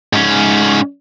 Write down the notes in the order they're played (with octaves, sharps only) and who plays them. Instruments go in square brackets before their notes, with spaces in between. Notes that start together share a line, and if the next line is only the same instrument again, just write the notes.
[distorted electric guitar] G#2 C#4